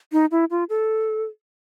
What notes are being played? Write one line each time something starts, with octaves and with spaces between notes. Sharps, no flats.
D#4
E4
F4
A4